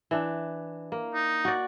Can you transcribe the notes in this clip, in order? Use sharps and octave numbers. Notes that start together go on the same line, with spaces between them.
E3 D4
A#3
D#4
F#4 D5